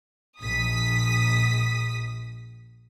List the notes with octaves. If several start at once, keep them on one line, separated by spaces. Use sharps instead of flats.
A#1 D#6 B6